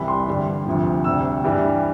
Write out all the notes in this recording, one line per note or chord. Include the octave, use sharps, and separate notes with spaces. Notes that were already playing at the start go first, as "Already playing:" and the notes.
Already playing: C2 C3 E3 G3 B5
C6
G2 D3 G3
D2 C3 F3
D2 C3 G3 E6
G2 E3 G3